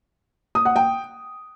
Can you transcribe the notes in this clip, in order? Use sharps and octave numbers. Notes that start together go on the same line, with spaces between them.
D#6
F#5
G5